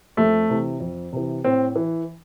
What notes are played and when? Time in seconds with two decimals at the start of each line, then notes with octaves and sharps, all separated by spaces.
0.17 F2 A3
0.50 C3 E3
0.80 F2
1.13 C3 E3
1.44 A2 C4
1.76 E3